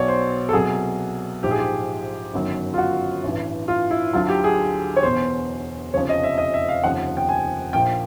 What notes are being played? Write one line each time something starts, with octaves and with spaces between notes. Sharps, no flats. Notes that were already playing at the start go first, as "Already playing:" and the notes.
Already playing: B1 B2 F#3 C#5 D5
C5
A4
C2 B2 F#3 G#4
A#1 G#2 F3 G4
G#4
G4
G1 F#2 D#3 F#3
F4
F#4
A1 G2 E3
F4
E4
D2 D3 F#3 F4
G4
G#4
C#5
E1 E2 B2 C5
F1 F2 C#3 F3 C#5
D#5
E5
D#5
E5
F5
F1 D#2 C#3 F3 F#5
G5
G#5
A#1 A#2 F3 G5